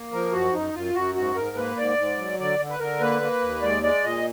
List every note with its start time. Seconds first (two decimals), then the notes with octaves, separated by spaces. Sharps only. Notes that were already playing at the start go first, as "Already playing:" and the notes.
Already playing: A#3
0.12 F3 A#4
0.32 F#2 F#4
0.53 F#2 D#4
0.73 F#2 F4
0.94 F#2 F#4
1.15 G#2 F#4
1.35 G#2 A#4
1.57 A#3 B4
1.76 G#2 D5
1.97 G#2
2.18 F#3
2.39 D3 D5
2.59 D3
2.70 B4
2.80 D3 A#4
3.00 A#3 B4
3.22 A#3
3.41 D#2
3.62 G#3 D5
3.83 G#3 D5
4.04 A#2 D#5